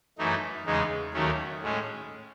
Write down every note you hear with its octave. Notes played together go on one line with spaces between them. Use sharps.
F#2 E3 A3 D#4
E2 C#3 G#3 D#4
D#2 D#3 F#3 A3 C#4
A2 G#3 C#4